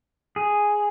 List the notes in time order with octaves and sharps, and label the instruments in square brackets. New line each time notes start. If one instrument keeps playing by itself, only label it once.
[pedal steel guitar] G#4